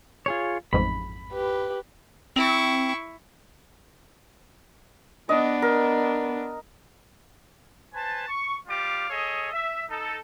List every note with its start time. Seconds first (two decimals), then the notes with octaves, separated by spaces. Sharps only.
0.26 F4 G#4 C#5
0.73 A1 F2 G#2 B5
1.33 G4 B4
2.36 C4 E4 C#6
5.29 B3 D4 D#5
5.62 A#4
7.93 B4 C5 G#5 A5
8.28 C#6
8.67 G3 F4 G4 F5 D6
9.10 G#4 A4 C#5 D#5
9.51 E5
9.89 D#4 A4